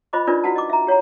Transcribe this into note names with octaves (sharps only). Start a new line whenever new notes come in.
F4 C5 D#5 B5 D6
D4 D#4 F4 A#4 B4 D5
E4 F#4 B4 F#5 A5
D#5 D6
E5 A#5
G4 C#5 F#5 A#5